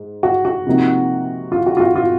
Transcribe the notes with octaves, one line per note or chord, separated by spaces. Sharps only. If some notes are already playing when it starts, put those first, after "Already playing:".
Already playing: G#2
F#4
F#4
C3 F3 A#3 D#4
F4
F#4
F4
F#4
F4